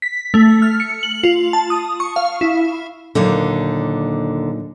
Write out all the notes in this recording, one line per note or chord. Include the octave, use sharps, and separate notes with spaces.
B6
A3
F6
C#7
F#7
F4
A5
D#6
C#6
F5
E4
D#2 A#2 D3 F#3 D#4